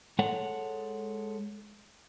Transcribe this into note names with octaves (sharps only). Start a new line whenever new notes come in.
G#3 A4 C#5 F#5